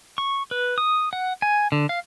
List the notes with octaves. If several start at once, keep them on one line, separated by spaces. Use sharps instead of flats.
C#6
B4
D#6
F#5
G#5
D3
F5